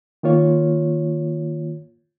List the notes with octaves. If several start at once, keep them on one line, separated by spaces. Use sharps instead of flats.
D#3 A#3 F4 C#5